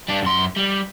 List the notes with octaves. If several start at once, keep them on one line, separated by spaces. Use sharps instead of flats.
G3 D4
F#2 C6
G3